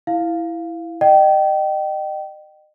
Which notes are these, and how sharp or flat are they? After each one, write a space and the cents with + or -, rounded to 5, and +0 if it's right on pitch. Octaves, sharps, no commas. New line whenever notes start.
E4 +0 F5 +0
D#5 -35 G5 -25